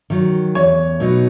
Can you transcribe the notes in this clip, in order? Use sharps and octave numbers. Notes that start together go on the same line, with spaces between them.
D#3 F#3
E2 C#5
B2 F#3 B3 D#4